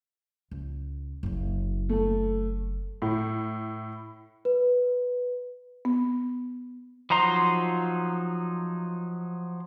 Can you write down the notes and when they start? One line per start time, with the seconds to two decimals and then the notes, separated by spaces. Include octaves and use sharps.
0.51 C#2
1.23 F#1 C#3
1.89 A3 A4
3.02 A2
4.45 B4
5.85 B3
7.10 F3 F#3 D#4 A#5 C6